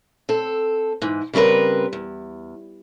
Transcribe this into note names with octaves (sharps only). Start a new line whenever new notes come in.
C4 A4
G#2 E3
C#3 G3 C4 A#4 B4
E2